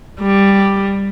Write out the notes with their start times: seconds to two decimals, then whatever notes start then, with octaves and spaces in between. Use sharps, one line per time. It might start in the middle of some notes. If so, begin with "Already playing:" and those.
0.20 G3